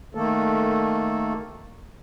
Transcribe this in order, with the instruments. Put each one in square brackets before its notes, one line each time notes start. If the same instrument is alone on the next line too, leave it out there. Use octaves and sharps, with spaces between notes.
[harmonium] D#3 A3 A#3 A4